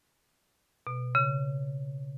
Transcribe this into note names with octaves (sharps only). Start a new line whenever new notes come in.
B2
C#3